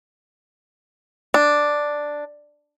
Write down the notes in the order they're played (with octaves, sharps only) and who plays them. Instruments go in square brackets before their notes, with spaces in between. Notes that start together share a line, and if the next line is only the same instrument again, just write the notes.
[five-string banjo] D4